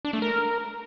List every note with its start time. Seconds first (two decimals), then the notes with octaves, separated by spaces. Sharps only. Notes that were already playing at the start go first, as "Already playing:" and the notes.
0.05 D4
0.13 A3
0.22 A#4